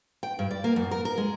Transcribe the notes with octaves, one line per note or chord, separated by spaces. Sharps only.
G5
G2
D5
A#3
F#2
A#4
A#4
G#3